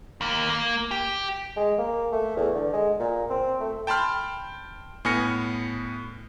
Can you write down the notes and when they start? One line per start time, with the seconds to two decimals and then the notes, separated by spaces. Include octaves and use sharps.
0.21 D#2 A#3
0.50 A#3
0.91 G4
1.57 G#3
1.79 A#3
2.12 A3
2.36 E2
2.55 D3
2.73 G#3
2.99 A#2
3.30 C4
3.60 A3
3.87 G5 A5 B5 C6 F6
5.05 A2 B3 G#5 F6 A#6 C#7